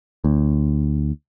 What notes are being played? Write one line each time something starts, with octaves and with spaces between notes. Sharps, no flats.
D2